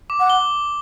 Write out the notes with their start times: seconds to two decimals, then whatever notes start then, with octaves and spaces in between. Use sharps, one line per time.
0.10 D6
0.20 F#5
0.30 G7